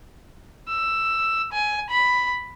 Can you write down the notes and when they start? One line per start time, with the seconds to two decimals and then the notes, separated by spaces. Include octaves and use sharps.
0.69 E6
1.53 G#5
1.90 B5